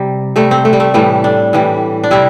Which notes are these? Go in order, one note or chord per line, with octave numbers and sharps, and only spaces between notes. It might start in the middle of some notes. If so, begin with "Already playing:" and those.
Already playing: C3 G3
C3 G3 A3
C4
A3
G3
A3
A2 E3 G3 A3
D4
A2 E3 G3
D4
C3 G3 E4